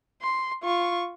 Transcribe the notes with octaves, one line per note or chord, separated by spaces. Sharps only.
C6
F4 C#6